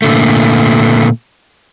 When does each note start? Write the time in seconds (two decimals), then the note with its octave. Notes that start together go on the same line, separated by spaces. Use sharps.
0.02 A#2 D3 A3